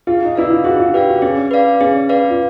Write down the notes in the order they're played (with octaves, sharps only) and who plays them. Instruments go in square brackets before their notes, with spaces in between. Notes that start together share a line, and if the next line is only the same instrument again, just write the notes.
[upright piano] F4 [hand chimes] G#4
[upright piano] D#4
[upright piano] E4 [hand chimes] B4 D5 F5
[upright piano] F4
[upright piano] F#4 [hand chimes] G#4
[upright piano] F4
[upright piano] G4 [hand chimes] B4 D5 F5
[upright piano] F#4
[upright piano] C#4 [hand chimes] G#4
[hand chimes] B4 D5 F5
[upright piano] C#4 [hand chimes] G#4
[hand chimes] B4 D5 F5
[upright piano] F4